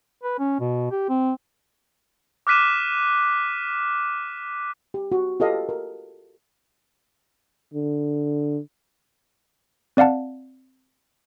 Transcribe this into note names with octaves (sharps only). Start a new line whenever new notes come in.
B4
C#4
B2
G4
C4
D6 F6 F#6 B6 D#7 E7
G4
F#4
F4 G4 A4 B4 D#5 F5
A#4
D3
C4 D5 F5 F#5 A5